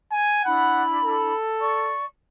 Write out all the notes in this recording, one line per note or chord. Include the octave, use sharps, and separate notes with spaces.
G#5
D4 E4 F#5 B5
A4
D5 C#6